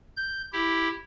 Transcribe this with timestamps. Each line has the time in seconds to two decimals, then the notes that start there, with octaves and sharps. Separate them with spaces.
0.16 G6
0.53 E4 G4